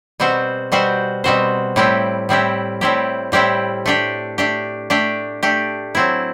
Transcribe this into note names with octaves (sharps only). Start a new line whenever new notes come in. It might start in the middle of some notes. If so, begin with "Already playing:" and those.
B2 G3 C4 F#4 C5
B2 G3 C4 F#4 C5
B2 G3 C4 F#4 C5
A2 G3 C4 E4 G4
A2 G3 C4 E4 G4
A2 G3 C4 E4 G4
A2 G3 C4 E4 G4
A3 D4 G4
A3 D4 G4
A3 D4 G4
A3 D4 G4
F#3 C4 E4